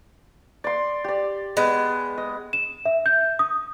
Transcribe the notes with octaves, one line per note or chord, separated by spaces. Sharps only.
D5 C6
G4 D5
G#3 B3
D#5
E7
E5
G6
D#6